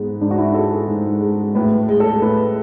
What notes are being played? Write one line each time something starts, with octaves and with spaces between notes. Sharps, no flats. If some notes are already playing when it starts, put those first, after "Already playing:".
Already playing: G#2 G#3 B3
G#2 D4
F#4
E4
G#3 A4
G#4
G#2
G#3
A2 B4
G#3
A4
A2 B4